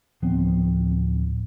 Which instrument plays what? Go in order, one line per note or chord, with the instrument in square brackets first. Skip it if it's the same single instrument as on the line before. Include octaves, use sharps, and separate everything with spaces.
[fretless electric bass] D1 F3 B3 C4